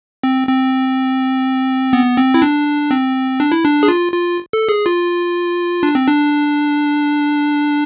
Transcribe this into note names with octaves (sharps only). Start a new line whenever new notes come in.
C4
C4
B3
C4
E4
D4
C4
D4
E4
D4
G#4
F4
F4
A4
G#4
F4
D4
C4
D4